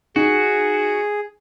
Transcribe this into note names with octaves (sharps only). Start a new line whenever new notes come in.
D#4 F#4 G#4